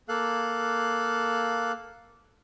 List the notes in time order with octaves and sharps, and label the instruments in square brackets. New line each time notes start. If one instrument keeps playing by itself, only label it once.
[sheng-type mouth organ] A#3 A4 F5 F#6